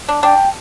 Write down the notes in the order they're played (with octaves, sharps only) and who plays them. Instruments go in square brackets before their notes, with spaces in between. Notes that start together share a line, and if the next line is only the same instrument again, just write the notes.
[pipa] D4
[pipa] D4 [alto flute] G5